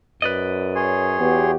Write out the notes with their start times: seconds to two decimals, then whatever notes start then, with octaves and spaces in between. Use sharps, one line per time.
0.22 F#2 B4 D5 D#5
0.75 G#4 C#5 C6
1.20 E2 B3 F#4 G4